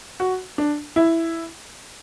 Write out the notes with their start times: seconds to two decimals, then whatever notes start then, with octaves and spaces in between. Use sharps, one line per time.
0.20 F#4
0.58 D4
0.96 E4